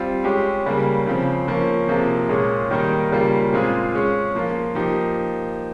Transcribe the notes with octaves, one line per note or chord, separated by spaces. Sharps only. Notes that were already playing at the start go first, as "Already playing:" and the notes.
Already playing: G3 C4 F4
G#3 C#4 G4
C#3 G3 A#3
C#3 F3 C4
F3 A#3 C#4
C3 F3 A#3 F4 G#4
A#2 G#3 C#4 G#4
D#3 G3 A#3 D#4 A#4
C#3 G3 A#3 F4
A#2 G#3 C4 F4 G#4
G#3 C#4 G#4
F3 A#3 F4
F3 A#3 D#4 G4